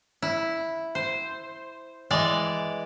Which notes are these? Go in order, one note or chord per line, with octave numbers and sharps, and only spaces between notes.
E4
C5
E3 G#3 D5